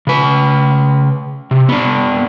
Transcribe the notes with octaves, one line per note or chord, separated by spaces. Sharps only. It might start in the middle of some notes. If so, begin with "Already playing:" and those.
C#3 B4
C3
B3 D4